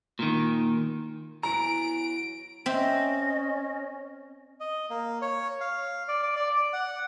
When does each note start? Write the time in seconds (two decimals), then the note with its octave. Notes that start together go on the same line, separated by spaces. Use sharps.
0.19 A#2 D#3
1.43 E3 F#3 B3 A#5 D7
2.66 C4 C#4 D#5 E5
4.60 D#5
4.90 A#3
5.22 C#5
5.61 F5
6.08 D5
6.23 D5
6.36 D5
6.57 D5
6.73 F#5